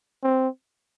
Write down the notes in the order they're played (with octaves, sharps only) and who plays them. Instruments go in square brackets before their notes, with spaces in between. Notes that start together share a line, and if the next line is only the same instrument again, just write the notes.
[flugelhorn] C4